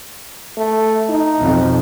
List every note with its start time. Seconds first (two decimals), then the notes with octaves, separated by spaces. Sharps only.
0.58 A3
1.09 D#4
1.40 B1 F2